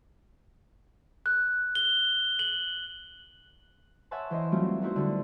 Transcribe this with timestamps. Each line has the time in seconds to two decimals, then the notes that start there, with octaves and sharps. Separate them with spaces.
1.26 F#6
1.75 G7
2.39 F#7
4.11 C#5 E5 F#5 G#5 A5 C6
4.30 E3 C5 D#5 C6
4.52 F#3 G3 A3 C4 E4 F4
4.81 B3 D#4 E4 F#4 C5
4.96 D3 G3